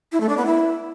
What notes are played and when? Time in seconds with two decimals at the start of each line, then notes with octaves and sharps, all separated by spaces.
0.12 E4
0.21 A3
0.29 D4
0.37 B3
0.46 E4